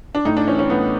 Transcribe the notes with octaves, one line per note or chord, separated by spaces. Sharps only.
D4
A2 D#4
D4
E3 C#4
C#4
A2 B3